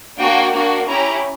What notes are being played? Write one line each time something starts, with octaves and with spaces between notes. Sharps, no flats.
A#3 D4 F#4 G5
A#3 D4 F#4
C#4 E4 G4 A#5